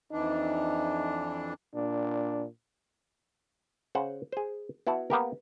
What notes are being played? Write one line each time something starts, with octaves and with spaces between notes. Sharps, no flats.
F2 E3 D4 D#4
A#2 D4
C#3 C5 F#5
G#4 C5
B3 E4 F#4 F#5 A5
A#3 B3 G4 A#4